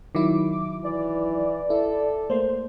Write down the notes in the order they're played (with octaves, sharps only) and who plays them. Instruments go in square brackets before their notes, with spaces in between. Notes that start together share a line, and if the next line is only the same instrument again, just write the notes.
[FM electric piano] D#3 F#3 E4 [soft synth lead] D6
[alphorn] E3 [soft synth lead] D5
[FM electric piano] E4 [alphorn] A4
[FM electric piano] A3 A#3 [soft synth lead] C5